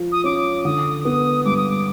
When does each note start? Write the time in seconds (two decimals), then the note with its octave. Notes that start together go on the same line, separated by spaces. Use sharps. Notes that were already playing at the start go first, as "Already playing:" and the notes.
Already playing: F3 F4
0.12 D#6
0.24 C#4 D6
0.65 D3 D#6
1.05 B3 D#6
1.45 G2 D6
1.57 D#6
1.69 D6